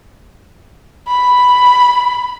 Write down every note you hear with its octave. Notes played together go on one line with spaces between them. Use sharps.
B5